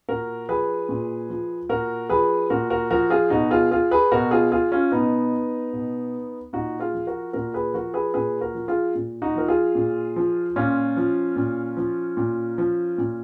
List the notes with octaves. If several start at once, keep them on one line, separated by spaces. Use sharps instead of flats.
A#2 F#4 A#4
F3 G#4 B4
A#2
F3
A#2 F#4 A#4
F3 G#4 B4
A#2 F#4 A#4
F#4 A#4
F3 F#4 A#4
F4 G#4
B2 D#4 F#4
F4 G#4
F4 G#4
G#4 B4
B2 F#4 A#4
F4 G#4
F4 G#4
C#4 F4
B2 B3 D#4
B2
A#2 D#4 F#4
F4 G#4
F3
F#4 A#4
A#2 F#4 A#4
G#4 B4
F3 F#4 A#4
G#4 B4
A#2 G#4 B4
F#4 A#4
F3
F4 G#4
A#2
D#4 F#4
F3 A#4
F4 G#4
A#2
F3
A#2 C#4 F4
F3
A#2
F3
A#2
F3
A#2